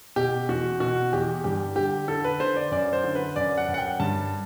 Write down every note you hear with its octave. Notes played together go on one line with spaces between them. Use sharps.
B2 G4
E2 F#4
B2 F#4
E2 G4
G2 G4
D3 G4
D3 A4
B4
D3 C5
D5
F#2 D5
C5
D3
B4
F#2 D5
F#5
F#2
F#5
G5
G2 A5